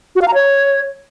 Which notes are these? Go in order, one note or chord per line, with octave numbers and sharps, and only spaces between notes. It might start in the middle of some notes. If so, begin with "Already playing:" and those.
F#4
F5
A#5
C#5